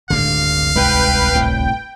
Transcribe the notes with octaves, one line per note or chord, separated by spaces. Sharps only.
D1 G#1 G2 D3 F5
C2 G#2 G#3 B4 G5
C2 A2 G5